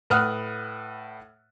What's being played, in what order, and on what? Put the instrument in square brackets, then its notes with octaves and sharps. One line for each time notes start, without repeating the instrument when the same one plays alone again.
[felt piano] A2 B4 F#5 D#6 F6 F#6